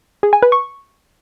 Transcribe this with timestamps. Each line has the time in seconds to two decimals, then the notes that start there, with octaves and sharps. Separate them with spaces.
0.23 G#4
0.33 G#5
0.42 B4
0.52 C#6